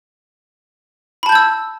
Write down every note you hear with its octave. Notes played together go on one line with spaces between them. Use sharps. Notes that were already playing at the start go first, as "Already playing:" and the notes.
A5 B5 E6 G6 G#6